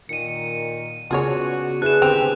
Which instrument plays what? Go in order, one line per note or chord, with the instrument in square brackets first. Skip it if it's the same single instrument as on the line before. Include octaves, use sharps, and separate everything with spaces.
[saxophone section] A#2 D#3 [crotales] C#7 D#7
[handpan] C#3 B3 D5 [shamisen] F4 G#4 C#5 [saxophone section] F#4
[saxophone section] D4 E4 [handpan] G#4 B4 [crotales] F#6 E7
[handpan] D3 [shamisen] C4 C5 G5 [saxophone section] G4 [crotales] F7